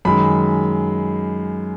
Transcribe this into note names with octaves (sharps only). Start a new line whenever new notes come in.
F#2 D#3 G#3 B5